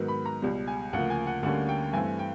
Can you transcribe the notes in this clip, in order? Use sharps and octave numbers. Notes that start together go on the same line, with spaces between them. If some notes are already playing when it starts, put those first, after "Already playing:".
Already playing: G#2 D#3 F#3 B3
B5
A#5
C#2 B2 G3
G#5
D2 C#3 F3 A#3 F#5
G#5
F#5
D2 D3 G3 A#3 C#4 F#5
G5
G2 E3 A3 C4 G#5
G5